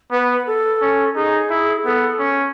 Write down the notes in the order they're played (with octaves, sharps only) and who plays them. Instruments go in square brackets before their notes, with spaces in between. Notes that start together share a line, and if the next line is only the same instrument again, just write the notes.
[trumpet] B3 [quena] B4
[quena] A4
[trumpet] C#4
[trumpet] D#4 [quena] G#4
[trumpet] E4
[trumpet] B3 [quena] A4
[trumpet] C#4